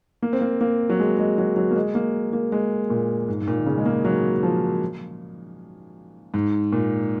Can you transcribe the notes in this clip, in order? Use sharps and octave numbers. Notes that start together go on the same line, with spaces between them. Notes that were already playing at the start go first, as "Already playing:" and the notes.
A#3
C4
A#3
A#3
F#3
G#3
G#3
F#3
F#3
A#3
G#3
A#3
A#3
G#3
A#2
G#2
G#2
A#2
D#3
C#3
G#3
A#3
F#3
F3
G#2
A#2